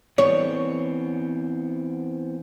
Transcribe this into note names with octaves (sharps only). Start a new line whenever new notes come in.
E3 B3 C4 C#5